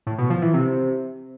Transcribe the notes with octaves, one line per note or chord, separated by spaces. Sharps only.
A2
B2
F3
E3
C3